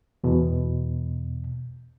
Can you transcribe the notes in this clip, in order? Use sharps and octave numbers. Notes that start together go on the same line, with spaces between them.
E2 B2